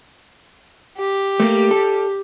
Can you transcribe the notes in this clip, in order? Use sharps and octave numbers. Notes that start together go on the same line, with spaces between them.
G4
G3 A3 A#3
A4